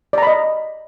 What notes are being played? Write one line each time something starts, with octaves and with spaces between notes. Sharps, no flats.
D5 D#5 A#5 B5